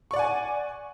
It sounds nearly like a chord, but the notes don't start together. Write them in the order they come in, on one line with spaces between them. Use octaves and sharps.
C#6 D5 F#5 G#5